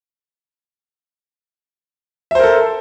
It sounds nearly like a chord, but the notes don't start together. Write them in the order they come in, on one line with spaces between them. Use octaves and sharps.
E5 C5 A#4 A4